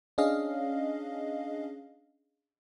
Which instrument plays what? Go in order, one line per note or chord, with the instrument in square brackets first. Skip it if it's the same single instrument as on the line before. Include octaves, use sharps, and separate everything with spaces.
[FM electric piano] C#4 D4 G#4 D#5 F5